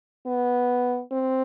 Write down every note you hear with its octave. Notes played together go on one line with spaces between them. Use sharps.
B3
C4